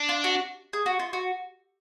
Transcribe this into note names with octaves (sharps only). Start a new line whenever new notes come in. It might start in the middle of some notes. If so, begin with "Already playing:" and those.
Already playing: D4
F4
F#4
G#4
F#4
F4
F#4